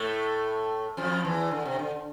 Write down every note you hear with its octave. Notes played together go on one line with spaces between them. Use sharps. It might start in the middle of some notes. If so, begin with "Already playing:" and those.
Already playing: A2 A3
F2 F3
E2 E3
D3
C3
D3